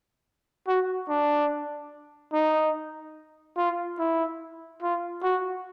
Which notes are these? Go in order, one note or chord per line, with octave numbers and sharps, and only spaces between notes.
F#4
D4
D#4
F4
E4
F4
F#4